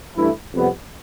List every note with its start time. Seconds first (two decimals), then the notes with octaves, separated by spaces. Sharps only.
0.17 G2 E3 A3 E4
0.54 F2 C3 G3 B3